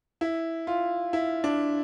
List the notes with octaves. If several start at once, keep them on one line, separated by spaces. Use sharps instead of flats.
E4
F4
E4
D4